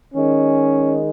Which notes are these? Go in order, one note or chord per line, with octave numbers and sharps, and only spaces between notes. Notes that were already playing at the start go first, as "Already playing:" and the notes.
D#3 G#3 C#4